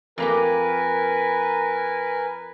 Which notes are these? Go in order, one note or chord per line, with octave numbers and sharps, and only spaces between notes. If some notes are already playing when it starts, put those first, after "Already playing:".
F2 A#3 G4 A#4 B4 G#5